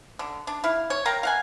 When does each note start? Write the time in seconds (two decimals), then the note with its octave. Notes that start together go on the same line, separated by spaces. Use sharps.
0.19 D3
0.47 D4
0.64 E4 F5
0.90 C#5
1.05 A#4 F5 G5 A#5
1.23 F5 F#5 G#5